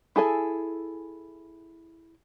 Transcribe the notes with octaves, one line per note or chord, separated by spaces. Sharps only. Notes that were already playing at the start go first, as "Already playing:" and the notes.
E4 G#4 A4 G#5